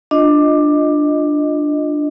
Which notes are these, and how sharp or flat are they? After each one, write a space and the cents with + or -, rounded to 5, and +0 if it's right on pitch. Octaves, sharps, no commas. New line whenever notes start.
D4 +10 F4 +0 D#5 +0